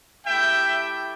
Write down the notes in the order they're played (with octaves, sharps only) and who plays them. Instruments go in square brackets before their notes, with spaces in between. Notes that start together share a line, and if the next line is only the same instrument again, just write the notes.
[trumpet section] A3 E4 G4 E5 G5